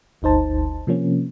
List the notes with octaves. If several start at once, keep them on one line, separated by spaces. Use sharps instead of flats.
G1 D2 D#4 C5 A5
C3 F3 A#3 C#4